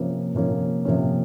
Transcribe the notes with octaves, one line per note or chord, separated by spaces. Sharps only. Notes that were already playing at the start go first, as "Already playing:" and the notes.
Already playing: C3 F3 A#3 C#4
C3 F3 A#3 C#4
C3 F3 A#3 C#4